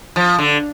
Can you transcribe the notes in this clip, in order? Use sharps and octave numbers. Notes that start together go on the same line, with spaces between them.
F3
D3